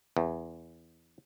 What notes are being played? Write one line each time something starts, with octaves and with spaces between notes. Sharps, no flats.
E2